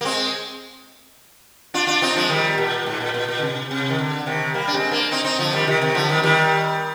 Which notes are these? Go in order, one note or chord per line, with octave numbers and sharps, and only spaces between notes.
A#3
G#3 C4
D4 F4
D4 F4
C4 D#4
F3 G#3
D#3 G3
A#2
G#2
A#2
A#2
A#2
D3
C3
C3
D#3
D3
C3 D#3
G3 A#3
D4
G#3 C4
A#3 D4
C4 D#4
C4 D#4
D3 F3
D#3 G3
C3 D#3
C3 D#3
D3 F3
D#3 G3
D#3 G3